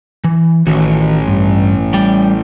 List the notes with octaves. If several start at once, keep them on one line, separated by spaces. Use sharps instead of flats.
E3
A1 D#3 F#4
G2
G3 D5 G5